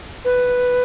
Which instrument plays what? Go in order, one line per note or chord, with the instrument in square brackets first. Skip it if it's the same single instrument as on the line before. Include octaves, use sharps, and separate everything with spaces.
[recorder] B4